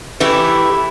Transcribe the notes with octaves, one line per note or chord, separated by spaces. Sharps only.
E3 A3 E4 G4